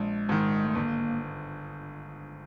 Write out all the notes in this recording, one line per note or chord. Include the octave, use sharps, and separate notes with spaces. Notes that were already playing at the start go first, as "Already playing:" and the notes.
Already playing: A#1 G#3
G#2 D#3
A3
G1 A#3